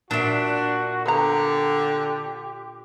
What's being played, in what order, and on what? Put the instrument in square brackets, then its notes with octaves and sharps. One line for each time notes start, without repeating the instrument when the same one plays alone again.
[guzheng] A#2 E5 [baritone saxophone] D4 [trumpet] F#4
[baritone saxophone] D3 [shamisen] B3 A#5 [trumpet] G4